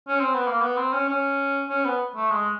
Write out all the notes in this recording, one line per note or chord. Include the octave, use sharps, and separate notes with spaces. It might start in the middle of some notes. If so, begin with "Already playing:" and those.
C#4
C4
B3
A#3
B3
C4
C#4
C#4
C#4
B3
A3
G#3